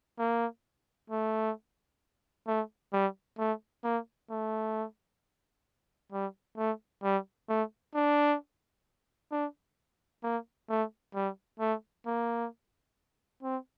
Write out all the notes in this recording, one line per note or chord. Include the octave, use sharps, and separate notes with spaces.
A#3
A3
A3
G3
A3
A#3
A3
G3
A3
G3
A3
D4
D4
A#3
A3
G3
A3
A#3
C4